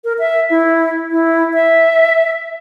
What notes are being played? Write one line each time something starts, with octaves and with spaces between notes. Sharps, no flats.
A#4
E5
E4
E4
E5